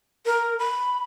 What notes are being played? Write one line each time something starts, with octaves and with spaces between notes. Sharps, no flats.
A#4
B5